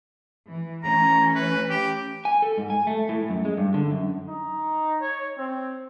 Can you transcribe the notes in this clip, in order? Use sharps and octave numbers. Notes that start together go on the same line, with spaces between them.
E3
E3 A3 C#4 A#5
B4
G4
G#5
A4
G#2
G#5
A3
A2
F#2
G#3
G2
D3
F#2
D#4
C#5
C4